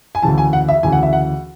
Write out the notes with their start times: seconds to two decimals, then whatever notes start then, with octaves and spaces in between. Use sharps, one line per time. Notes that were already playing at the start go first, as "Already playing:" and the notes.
0.15 G#5
0.22 D2 C#3 E3 A5
0.38 G#5
0.53 F#5
0.68 E5
0.83 D2 C#3 E3 G#5
0.92 F#5
1.03 E5
1.13 F#5